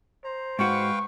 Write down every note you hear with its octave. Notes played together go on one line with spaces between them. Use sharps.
C5 A#5
G#2 F#4 B4 F5 G5 C#6